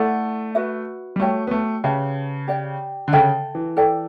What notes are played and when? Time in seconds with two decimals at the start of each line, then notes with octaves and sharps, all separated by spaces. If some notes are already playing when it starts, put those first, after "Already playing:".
Already playing: A3 E4 A4 D5 F#5
0.55 F#4 B4 E5
1.16 G3
1.20 A3 F#4 C#5 G5
1.47 B3
1.51 A3
1.84 C#3 G4 B4 E5 A5
2.47 G4 D5 G5
3.08 D3
3.12 C#3 A4 E5 G5
3.55 E3
3.77 A4 D5 G5